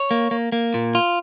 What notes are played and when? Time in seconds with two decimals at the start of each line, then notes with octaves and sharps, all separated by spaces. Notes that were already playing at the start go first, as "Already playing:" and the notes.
Already playing: C#5
0.11 A#3
0.31 A#3
0.52 A#3
0.74 A#2
0.95 F4